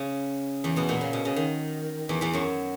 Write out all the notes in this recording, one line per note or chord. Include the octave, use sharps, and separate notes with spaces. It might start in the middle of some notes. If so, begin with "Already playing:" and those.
Already playing: C#3
E2 E3
B2 B3
A#2 A#3
C#3
B2
C#3
D#3
E2 E3
E2 E3
F#2 F#3